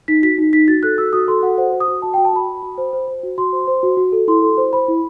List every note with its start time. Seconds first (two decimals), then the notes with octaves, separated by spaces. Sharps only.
0.08 D#4 B6
0.23 F#4 B6
0.38 D#4
0.53 D#4 B6
0.68 F#4 A6
0.83 A4 F#6
0.98 F#4 E6
1.13 F#4 D#6
1.28 A4 C6
1.43 F#4 F#5
1.58 C5 F#5
1.73 C5
1.80 D#6
1.88 F#4
2.02 F#4 A5
2.14 G5
2.18 F#4
2.25 A5
2.33 F#4 B5
2.48 F#4
2.63 F#4
2.78 C5
2.93 C5
3.08 C5
3.23 F#4
3.38 F#4 C6
3.52 C5
3.67 C5
3.83 F#4
3.97 F#4
4.12 A4
4.28 E4 C6
4.42 A4
4.58 C5
4.73 C5 B5
4.88 E4